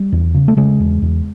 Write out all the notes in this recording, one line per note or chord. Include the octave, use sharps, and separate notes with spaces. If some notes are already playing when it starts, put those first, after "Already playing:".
Already playing: G3
E2
C#3
A3
C#3 G#3
E2
E2